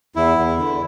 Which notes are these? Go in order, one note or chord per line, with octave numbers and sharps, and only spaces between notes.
E2 E4
E2
D3